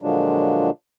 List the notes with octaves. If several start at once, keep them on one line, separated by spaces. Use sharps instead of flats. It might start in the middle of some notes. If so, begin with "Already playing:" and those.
A#2 D3 F3 F#3 G#3 D4